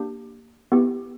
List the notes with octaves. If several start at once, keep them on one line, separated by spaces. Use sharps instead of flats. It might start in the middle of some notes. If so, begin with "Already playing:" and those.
Already playing: A#3 D4 G4
B3 E4 G4